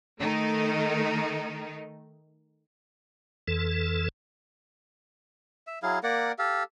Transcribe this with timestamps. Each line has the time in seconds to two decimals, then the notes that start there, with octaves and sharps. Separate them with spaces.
0.20 D#3 A3 D#4
3.48 F2 E3 A4
5.67 E5
5.83 F#3 E4 G#4 F5
6.03 A#3 A#4 D5 F#5
6.39 G4 A4 F5